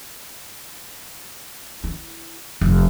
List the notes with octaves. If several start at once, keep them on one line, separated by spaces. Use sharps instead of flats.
E4
F1